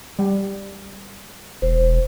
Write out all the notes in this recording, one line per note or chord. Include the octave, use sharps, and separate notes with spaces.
G3
E1 C5